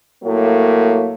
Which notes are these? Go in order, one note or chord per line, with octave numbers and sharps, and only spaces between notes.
A2 F#3 A#3